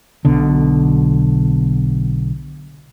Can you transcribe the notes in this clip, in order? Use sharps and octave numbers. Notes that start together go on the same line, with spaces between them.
B1 B2 D3